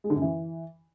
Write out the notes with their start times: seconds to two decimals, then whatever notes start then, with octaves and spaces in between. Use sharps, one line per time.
0.04 G#3
0.10 D3
0.16 F#2
0.22 E3